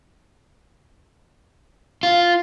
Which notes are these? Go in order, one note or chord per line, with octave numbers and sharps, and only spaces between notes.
F4